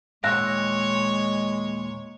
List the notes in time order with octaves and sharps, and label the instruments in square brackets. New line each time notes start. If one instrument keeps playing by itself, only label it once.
[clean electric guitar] D#2 A#2 E5 [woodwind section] G#3 [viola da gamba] C#5 [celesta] F#6 A#6